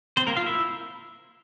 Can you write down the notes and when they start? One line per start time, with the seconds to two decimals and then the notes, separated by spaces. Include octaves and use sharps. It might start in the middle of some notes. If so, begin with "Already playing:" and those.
0.17 C4 C5
0.27 A#3 A#4
0.36 F4 F5
0.46 E4 E5